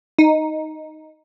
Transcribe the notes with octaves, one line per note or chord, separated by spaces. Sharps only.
D#4